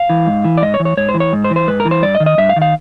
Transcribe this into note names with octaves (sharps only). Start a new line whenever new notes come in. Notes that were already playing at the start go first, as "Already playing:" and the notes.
Already playing: F5
E3
G#2
E3
D5
G#2 D#5
C#5
E3
C#5
G#2 C#5
C5
E3
C#5
G#2
C5
E3
C5
G#2 B4
A#4
E3
C5
G2 D5
D#5
D#3
D#5
G2 E5
F5
D#3
F5